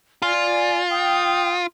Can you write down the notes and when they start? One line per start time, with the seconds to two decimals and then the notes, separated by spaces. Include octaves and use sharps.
0.22 F4 D5 G#5
0.89 G5 D#6